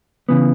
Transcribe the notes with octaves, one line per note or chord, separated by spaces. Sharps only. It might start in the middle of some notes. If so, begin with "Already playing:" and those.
C#3 E3 B3